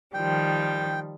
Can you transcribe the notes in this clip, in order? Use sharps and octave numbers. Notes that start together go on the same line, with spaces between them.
D#3 F3 G3 G5